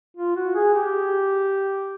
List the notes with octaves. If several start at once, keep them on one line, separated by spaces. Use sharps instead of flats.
F4
F#4
G#4
G4